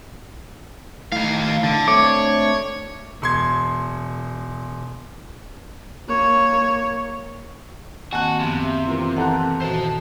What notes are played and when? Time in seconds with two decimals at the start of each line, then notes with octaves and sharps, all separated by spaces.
1.12 A2 D#3 F5
1.64 D3
1.88 A3 C4 D4 C#5 D6
3.22 E1 C6 G#6
6.08 A#3 C#5
8.13 D#3 A#3 C4 F#4 G#5 A5 F#6
8.40 F#2 C3 F3 B3
8.63 E5
8.87 E3 F3 A#4
9.16 E3 A4 F#5 A#5 F#6
9.62 A#2 D#3 F#4 C5 A5